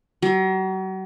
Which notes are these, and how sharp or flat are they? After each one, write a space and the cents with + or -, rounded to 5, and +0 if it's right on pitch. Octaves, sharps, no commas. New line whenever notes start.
F#3 +40